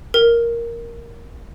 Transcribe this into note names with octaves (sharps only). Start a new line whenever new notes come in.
A#4